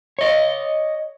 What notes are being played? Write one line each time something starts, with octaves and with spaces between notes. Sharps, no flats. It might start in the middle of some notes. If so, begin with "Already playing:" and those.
C#5 D#5